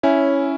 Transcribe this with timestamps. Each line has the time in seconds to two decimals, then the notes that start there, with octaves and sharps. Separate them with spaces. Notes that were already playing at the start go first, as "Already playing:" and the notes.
0.03 C#4 E4 C#5 E5 G#5